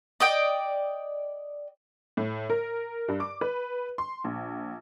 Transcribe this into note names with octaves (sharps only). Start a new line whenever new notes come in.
D5 D#5 G5
A2
A#4
G2
D6
B4
C6
A#1